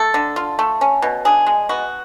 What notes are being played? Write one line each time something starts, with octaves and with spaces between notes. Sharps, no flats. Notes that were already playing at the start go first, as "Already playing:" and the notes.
Already playing: A3 A4
D3
F4
A3
C#4
B2
D4 G#4
G#3
B3 F#4